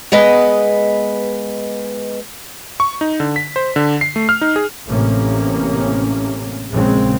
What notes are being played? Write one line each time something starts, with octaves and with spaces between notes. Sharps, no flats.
G#3 B3 B4 D#5
C#6
D#4
D3
B6
C5
D3
C7
A3
F6
D#4
G#4
A1 A2 C3 A#3 C#4
A#1 F#2 A#2 C#3 G#3 C4